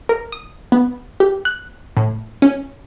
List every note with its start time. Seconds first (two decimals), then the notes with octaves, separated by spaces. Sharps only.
0.09 A#4
0.32 D#6
0.72 B3
1.20 G4
1.45 F#6
1.97 A2
2.42 C#4